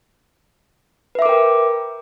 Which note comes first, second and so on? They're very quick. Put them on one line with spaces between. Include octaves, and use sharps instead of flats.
B4 E5 D6 A#4 G5